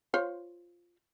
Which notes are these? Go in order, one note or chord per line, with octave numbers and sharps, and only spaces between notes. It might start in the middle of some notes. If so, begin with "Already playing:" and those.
F4 C5 C#5